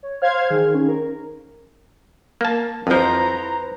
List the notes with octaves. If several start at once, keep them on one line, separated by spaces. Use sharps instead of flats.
C#5
C5 F5 F6 G#6
D#3 G#4
C#4
A#4
A#3 A5
F2 F3 E4 B4 C5 A#5